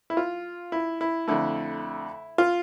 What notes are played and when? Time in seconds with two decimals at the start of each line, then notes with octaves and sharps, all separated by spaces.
0.10 E4
0.17 F4
0.72 E4
1.01 E4
1.28 F2 D3 A3 E4
2.38 F4